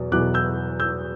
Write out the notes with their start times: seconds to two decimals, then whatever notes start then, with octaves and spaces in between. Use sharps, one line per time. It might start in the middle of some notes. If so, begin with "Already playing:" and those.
Already playing: E2 B2 F#3
0.12 E2 B2 F#3 B3 E4 D6 F#6
0.34 E6 G6
0.80 E6 G6